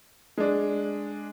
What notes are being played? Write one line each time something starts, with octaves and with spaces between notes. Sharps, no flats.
G#3 D4